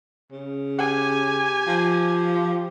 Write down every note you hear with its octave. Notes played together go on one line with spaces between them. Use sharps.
C#3
G4 G#5
F3